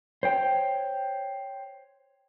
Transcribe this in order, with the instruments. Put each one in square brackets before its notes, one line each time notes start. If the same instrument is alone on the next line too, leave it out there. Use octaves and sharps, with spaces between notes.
[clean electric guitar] C5 C#5 G5